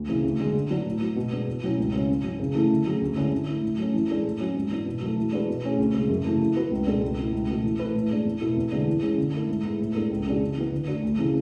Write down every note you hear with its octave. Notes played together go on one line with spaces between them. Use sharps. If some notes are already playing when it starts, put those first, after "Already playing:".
Already playing: D2
C#3 E3
D2
D3 G#3
D3
F#3 B3 D4
A2
F#3 B3
B2
G#3 B3 D4
E2
B2 F#3 C#4 E4
C#2
C#3 G#3 C#4
G#2
F#3 C#4
C#3
E3 A3 C#4 E4
D3
F#3 A3 C#4 G#4
D2
D3 G#3 C#4 E4
D3
A3 E4
A2
F#3 A3 C#4
E3
G#3 D4 A4
A2
F#3 C#4
G#2
E3 B3 D4
B2
F#3 A3
E3
G#3 D4 F#4 B4
B2
A3 C#4 G#4
D2
C#3 G#3
F#2
C#3 E3 A3
E3
B3 F#4 B4
C#2
B2 G#3 D4 A4
C#2
B2 A3 E4
C#2
B2 A3
E3
A3 E4 B4
A2
G#3 D4
E2
B2 A3 E4 A4
E2
D3 G#3 D4
E3
G#3 C#4
D3
A3 E4 A4
G#2
G#3 B3 E4
A2
G#3 B3 D4 A4
C#2
C#3 G#3 D4 F#4
C#3
E3 B3
D3
A3 D4 F#4
D2
C#3 E3 A3